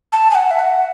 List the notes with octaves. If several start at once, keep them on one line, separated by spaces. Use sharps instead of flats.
A5
G#5
F#5
E5
F#5